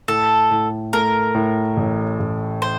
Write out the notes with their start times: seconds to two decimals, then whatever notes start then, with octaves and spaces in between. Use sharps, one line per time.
0.08 A2 A4
0.51 A2
0.93 A3 A#4
1.35 A2
1.77 A1
2.19 A1
2.62 C5